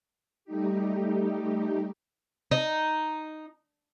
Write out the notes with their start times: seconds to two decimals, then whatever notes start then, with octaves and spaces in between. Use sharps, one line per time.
0.45 G3 A3 D#4 G4
2.51 D#4